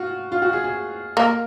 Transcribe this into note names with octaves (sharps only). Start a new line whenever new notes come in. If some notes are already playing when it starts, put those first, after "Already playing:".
Already playing: F4 F#4
F4
F#4
G#4
G#4
A#3 A#4